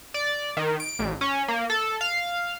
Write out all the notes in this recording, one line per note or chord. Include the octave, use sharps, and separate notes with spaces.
D5
D#3
D7
A1
C#4
A#3
A4
F5